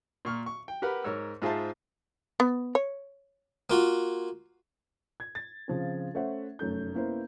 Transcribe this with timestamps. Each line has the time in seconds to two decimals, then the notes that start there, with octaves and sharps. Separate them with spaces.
0.25 A#2 C#6 F6
0.46 C#6
0.68 G5
0.82 G4 A#4 B4 F#5 B5
1.04 G#2 A#4 C#5 E6
1.42 G#2 F4 G#4 C5 E5 A5
2.40 B3
2.75 C#5
3.70 A#3 F4 F#4
5.20 G#6
5.35 A6
5.68 C#3 F3 C4
6.14 A3 C#4 C5 E5 F#5
6.59 F1 F#2 A3 G6
6.95 A#3 B3 C#4 E4 A#4 C5